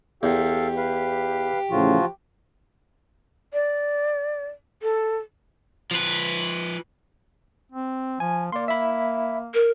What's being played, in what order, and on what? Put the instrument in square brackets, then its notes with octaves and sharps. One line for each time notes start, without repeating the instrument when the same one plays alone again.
[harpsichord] E2 [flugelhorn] G4 [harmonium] A4 F5
[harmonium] B4 F5
[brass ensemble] A1 A2 C#3 [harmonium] F3 F4 F#4
[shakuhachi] D5
A4
[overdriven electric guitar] F3 B4
[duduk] C4
[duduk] F3 [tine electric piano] G#5
[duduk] A#3 [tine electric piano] D5 C6
[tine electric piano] E5 B5
[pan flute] A#4